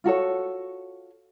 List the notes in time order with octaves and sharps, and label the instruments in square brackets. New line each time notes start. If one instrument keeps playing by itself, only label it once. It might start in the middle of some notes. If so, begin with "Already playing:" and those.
[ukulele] F4 F#4 A4 C#5